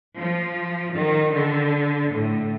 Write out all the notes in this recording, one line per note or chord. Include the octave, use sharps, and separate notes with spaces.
F3
D#3
D3
A2